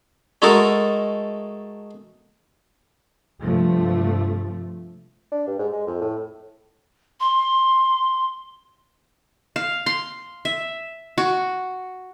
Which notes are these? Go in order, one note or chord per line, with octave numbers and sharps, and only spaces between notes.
G#3 A3 D#4 F#4 A4 A#4
G2 C3 F3 A3
D4
G2
G#2
G#3
F2
A2
C6
F5
C6
E5
F#4